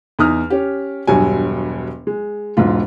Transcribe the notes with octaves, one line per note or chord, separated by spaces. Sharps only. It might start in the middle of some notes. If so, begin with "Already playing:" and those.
E2 D#4 D#6 F6
C#4 G4
E1 G2 F#3 G#5
G#3
E1 G#2 F4